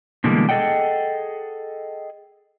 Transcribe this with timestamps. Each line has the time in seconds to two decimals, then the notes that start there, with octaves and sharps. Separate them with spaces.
0.24 B2 D3 E3 G3 G#3 A#3
0.49 G#4 A4 D#5 F#5 G5